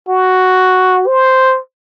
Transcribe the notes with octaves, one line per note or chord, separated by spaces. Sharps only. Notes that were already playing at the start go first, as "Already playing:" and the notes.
F#4
C5